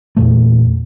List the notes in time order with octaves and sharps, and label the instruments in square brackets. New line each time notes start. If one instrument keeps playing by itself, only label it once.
[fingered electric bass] E2 A#2 A3